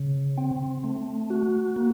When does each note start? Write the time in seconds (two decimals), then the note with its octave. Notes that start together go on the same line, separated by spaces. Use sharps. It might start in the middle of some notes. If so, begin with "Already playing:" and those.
Already playing: C#3
0.38 C4
0.84 A3
1.30 F#4
1.76 A#3